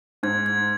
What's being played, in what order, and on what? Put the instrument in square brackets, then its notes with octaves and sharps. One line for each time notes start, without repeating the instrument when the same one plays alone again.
[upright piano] G#2 [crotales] G#6
[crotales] G#6